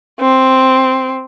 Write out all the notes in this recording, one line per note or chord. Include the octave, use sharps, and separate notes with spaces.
C4